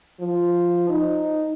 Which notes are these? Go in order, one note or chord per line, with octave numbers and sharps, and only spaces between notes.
F3
D#4